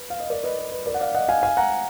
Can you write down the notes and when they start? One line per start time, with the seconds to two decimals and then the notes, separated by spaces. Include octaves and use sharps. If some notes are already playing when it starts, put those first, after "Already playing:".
Already playing: B4
0.10 F5
0.20 D#5
0.30 A#4 D5
0.43 B4 D#5
0.59 B4
0.72 B4
0.86 A#4 D5
0.94 F#5
1.00 D5 F5
1.15 D#5 F#5
1.29 F5 G#5
1.43 F5 G#5
1.57 F#5 A#5